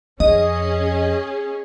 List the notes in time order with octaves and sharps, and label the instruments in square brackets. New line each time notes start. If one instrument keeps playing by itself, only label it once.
[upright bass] F2 [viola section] C#4 G#4 [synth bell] D#5